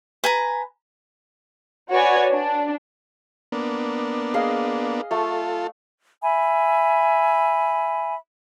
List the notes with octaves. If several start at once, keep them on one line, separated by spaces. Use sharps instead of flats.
B4 G#5 A#5
F#4 B4 C#5 D5 G#5
D4
A#3 B3 D4
G#4 D#5 F5
A3 F4 A4
E5 G#5 B5